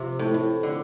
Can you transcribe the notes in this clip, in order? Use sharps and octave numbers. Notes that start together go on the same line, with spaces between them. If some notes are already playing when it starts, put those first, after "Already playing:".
Already playing: C3 F3
A2
A2
D3